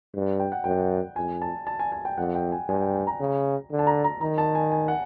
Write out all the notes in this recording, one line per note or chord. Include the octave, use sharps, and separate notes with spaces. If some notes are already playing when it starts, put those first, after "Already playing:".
G2
G5
F#5
F#2 G5
F2 G#5
A5
A5
G#5
G#5
G5
F2 F#5
G5
G#5
G2 G#5
G5
G#5
A#5
C#3
D3
A5
A#5
A#5
D#3 A#5
A5
G#5
G#5
F#5